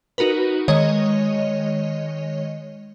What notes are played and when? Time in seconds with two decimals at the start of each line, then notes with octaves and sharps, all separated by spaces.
0.18 D#4 F#4 A#4 B4
0.68 D#3 G#3 C#5 D#5